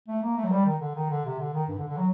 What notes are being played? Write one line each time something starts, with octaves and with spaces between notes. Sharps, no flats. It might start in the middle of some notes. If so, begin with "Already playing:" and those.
A3
A#3
A3
F#3
G3
D#3
D3
D#3
D3
C3
D3
D#3
G2
D3
D3
F#3